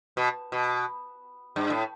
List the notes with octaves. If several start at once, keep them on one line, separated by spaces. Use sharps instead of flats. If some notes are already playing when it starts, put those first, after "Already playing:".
B2
B2
G2
A2